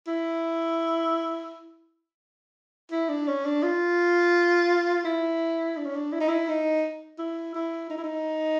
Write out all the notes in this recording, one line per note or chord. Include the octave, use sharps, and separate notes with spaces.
E4
E4
D4
C#4
D4
F4
E4
D4
C#4
D4
E4
D#4
E4
D#4
E4
E4
D#4
E4
D#4